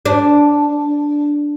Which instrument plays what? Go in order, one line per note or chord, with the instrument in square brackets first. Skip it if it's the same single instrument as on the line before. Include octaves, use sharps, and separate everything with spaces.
[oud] D4